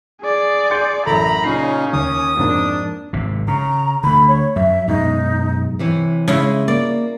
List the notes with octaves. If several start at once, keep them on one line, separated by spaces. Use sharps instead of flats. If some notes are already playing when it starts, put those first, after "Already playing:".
G#4 D5
C6 G6 C#7
A1 F#2 A4 A#5 B5
A#2 C#3 C#4 D#4 C7
D#2 D#6
F2 G#2 A#3 D4
G#1 C3
C#3 A#5
D3 A3 B5
C#5
F#2 F#3 E5
F#2 B2 G#3 D#4
C3 E3 C#5
C#3 G#3 E4
A#3 D5